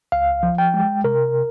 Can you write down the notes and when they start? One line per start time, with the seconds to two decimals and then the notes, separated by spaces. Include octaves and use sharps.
0.12 C#2 F5
0.43 F3
0.58 G5
0.74 G#3
1.04 C3 A#4